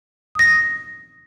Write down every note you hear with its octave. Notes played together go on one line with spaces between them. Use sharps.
D#6 A#6